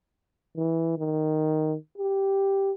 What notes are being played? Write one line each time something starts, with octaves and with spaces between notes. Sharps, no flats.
E3
D#3
G4